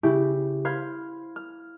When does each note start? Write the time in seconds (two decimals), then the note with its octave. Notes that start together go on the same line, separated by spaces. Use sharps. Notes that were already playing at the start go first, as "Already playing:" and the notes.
0.03 C#3 E4 G4
0.65 C5 F5 B5 F6 G#6
1.36 F6